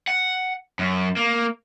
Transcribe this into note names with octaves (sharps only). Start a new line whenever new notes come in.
F#5
F#2
A#3